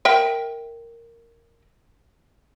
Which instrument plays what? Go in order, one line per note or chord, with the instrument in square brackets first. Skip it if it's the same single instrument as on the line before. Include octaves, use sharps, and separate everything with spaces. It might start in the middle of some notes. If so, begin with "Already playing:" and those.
[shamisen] A#4 E5 G5